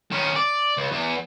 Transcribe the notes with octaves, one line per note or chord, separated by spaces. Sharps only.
D#3 C#4
D5
C#2
E2